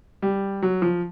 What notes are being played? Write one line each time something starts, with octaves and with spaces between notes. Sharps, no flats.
G3
F#3
F3